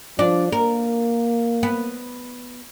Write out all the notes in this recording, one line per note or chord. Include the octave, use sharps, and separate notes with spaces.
F3 D4
A#3 A#4
B3